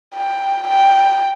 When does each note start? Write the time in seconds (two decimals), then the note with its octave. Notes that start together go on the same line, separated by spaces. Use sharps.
0.15 G5
0.67 G5